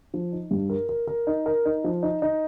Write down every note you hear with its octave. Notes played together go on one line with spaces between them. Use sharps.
F3
D#4
G2
A#4
A#4
A#4
D#4
A#4
D#4
F3
D#4
D#4